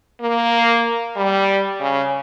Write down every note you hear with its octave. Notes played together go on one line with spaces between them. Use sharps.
A#3
G3
C#3